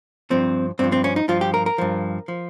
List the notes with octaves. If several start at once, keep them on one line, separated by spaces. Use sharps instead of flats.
G2 F3 C4
G2 F3 C4
C4
C#4
D#4
G2 F3 F4
G4
A#4
A#4
G2 F3
F3